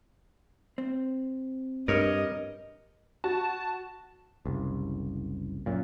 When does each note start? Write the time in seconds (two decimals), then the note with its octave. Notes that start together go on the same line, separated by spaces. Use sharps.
0.78 C4
1.88 G2 A#4 C#5 D#5
3.24 F#4 A5
4.45 F#1 C2
5.66 F#2 A#2